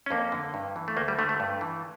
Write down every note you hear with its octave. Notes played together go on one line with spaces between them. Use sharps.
C#4
F2 A#3
D3
G2
E3
A3
D2 A#3
G3
D3 A3
A3
G2
E3